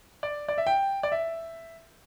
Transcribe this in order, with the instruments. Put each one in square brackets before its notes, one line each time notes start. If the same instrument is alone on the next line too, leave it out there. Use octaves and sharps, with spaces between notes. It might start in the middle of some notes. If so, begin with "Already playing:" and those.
[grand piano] D5
D5
E5
G5
D5
E5